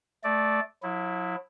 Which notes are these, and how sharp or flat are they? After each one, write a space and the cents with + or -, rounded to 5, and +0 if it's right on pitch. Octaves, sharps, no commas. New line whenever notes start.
A3 -15 D5 +0
F#3 -45 E4 +0